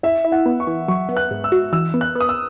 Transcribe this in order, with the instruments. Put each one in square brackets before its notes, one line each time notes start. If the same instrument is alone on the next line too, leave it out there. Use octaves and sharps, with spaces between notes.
[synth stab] E4 [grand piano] E5
[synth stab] E4
[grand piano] F#5
[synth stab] B3
[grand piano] C#6
[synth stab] E3
[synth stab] F#3 [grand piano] C#6
[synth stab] B3
[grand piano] F#6
[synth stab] G#2
[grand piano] E6
[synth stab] F#4
[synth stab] E3 [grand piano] E6
[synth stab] B3
[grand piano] F#6
[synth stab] B3
[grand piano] D#6
E6